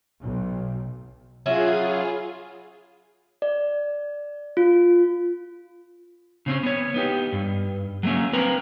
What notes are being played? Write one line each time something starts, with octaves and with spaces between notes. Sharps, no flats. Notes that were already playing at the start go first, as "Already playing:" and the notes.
B1
F#3 C#4 E4 F4 G#4
D5
F4
C#3 C4 C#4
B3 C#5
B3 D#4 G4
G2
F#3 A3 A#3 C#4
C4 A#4 B4 A#5